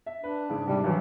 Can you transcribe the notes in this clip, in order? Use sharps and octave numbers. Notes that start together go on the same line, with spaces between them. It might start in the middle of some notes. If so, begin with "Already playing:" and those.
E5
D4 B4
G#2 C#3 D6
G#2 C3 G3
G#1 G2 E3 F#3